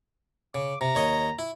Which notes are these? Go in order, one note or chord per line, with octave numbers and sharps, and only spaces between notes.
C#3 D6
C3 A#5
D#2 C#5 D#5
E4